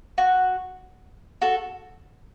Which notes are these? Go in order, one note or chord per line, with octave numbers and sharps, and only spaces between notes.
F#4
F#4 A4